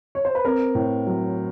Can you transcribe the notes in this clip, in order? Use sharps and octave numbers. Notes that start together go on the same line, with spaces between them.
C#5
C5
B4
C4 A#4
A2
F#3